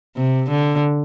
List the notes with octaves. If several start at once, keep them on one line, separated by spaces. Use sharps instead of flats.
C3
D3